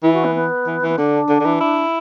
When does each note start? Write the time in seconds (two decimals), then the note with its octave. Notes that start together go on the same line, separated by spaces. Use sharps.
0.03 E3 E4
0.14 F#4
0.24 B3
0.34 B3
0.66 E3
0.82 E3
0.88 B3
0.98 D3 D4
1.29 D3
1.40 D3
1.46 E3
1.60 E4